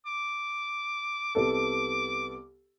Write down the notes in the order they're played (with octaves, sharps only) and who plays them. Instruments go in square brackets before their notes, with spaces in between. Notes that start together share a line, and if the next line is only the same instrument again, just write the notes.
[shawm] D6
[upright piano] C2 B3 A4